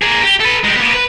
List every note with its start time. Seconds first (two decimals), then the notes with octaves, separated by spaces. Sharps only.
0.02 A#3 G#4
0.23 G4
0.40 A4 B4
0.64 G#3 G4
0.75 A#3 B3
0.93 B4